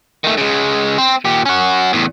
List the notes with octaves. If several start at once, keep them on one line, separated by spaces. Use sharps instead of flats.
D#3 A3
C#3 G#3
C4
A#2 G4
C#4 F#4
E2 A2